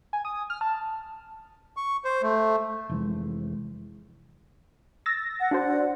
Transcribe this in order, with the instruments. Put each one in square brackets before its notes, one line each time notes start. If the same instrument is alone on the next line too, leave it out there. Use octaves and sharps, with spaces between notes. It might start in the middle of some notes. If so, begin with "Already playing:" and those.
[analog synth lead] G#5
D#6
F6
A5
[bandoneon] C#6
C5
A3
[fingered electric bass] F1 E3 G#3
[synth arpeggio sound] E6 A6 A#6
[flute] F#5
[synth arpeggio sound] D4 F#4 C5